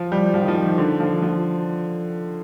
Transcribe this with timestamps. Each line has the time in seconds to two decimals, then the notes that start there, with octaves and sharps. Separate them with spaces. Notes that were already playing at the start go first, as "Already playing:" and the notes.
Already playing: F3
0.12 G3
0.34 F3
0.41 D#3
0.48 F3
0.63 D#3
0.78 D3
1.00 F3
1.22 F3